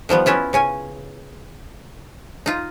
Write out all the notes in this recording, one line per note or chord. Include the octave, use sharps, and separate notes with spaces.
D#3 F3 G3 B3
B3 C#4 E4 F4
C#3 C#4 G#5
D#4 F4